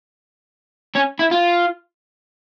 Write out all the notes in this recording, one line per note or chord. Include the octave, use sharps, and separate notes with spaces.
C#4
E4
F4